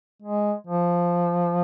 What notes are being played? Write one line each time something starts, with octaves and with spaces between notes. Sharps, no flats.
G#3
F3